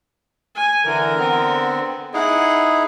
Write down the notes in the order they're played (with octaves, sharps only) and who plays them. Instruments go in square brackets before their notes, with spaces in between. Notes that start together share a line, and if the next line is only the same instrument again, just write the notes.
[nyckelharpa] G#5
[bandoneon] D3 E3 [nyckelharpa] A#4
[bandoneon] D3 B3 C4
[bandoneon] D#4 E4 G#4 [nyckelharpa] F#5